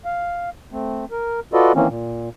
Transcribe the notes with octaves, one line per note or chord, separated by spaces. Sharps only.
F5
A3 C4
A#4
F4 F#4 A4 B4 D5 D#5
D#3 E3 A#3 C4 C#4
A#2